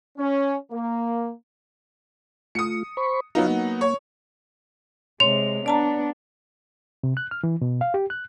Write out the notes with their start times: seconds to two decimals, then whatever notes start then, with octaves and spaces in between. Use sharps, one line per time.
0.18 C#4
0.71 A#3
2.55 A3 F4 D#6 C#7
2.97 C5 B5 C#6
3.35 F#3 B3 D#4 F4 F5
3.50 A#3
3.81 C#5
5.20 C3 G#3 C#5 C6 F7
5.66 B3 D4 D5 A5 A#5
7.03 C3
7.17 F#6
7.31 F6
7.44 E3
7.61 B2
7.81 F5
7.94 G4
8.10 F#6